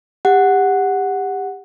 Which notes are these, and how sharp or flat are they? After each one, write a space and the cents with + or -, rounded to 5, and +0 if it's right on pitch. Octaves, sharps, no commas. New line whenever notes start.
G4 +25 F#5 +0